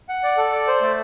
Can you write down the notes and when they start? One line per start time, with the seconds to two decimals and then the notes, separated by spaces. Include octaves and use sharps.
0.09 F#5
0.24 D5
0.37 A4
0.52 D5
0.68 C5
0.81 A3